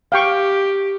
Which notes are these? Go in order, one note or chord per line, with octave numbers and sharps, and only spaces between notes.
G4 F5 G5 C#6